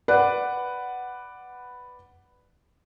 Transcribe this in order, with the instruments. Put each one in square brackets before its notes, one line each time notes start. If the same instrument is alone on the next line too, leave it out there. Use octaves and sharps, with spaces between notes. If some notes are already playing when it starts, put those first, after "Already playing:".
[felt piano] B4 D5 F#5